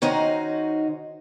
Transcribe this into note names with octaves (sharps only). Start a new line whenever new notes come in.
D#3 C#4 D#4 F#4 C5